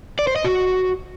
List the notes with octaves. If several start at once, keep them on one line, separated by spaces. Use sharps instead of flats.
D5
C5
D#5
F#4